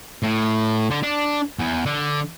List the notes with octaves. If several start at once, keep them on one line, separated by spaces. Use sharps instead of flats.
A2
D3
D4
E2
D3